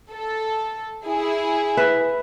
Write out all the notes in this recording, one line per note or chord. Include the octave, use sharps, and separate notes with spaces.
A4
E4 G#4
B4 E5